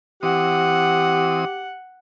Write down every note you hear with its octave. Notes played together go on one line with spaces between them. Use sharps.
E3 C4 G4 F#5 D#6